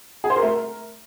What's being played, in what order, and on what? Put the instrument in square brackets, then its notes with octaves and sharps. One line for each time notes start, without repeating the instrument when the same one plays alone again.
[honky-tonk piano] G#4
C5
A#4
A3
A#4